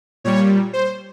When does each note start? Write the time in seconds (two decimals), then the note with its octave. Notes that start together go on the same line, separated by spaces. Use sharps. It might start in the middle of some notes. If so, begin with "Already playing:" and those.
0.24 A#2 G3 C#5
0.73 C5